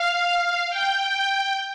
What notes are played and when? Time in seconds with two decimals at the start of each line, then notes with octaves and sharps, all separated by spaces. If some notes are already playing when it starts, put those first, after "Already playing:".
Already playing: F5
0.70 G5